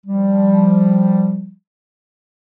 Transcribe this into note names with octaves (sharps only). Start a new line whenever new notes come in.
F3 G3